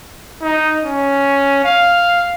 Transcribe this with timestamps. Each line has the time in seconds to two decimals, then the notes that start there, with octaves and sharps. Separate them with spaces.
0.42 D#4
0.84 C#4
1.64 F5